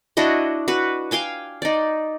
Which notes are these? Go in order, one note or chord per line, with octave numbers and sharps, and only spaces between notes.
D4 E4 F#4 D#5
F#4 B4
F5 G5 G#5 D6
D#4 D5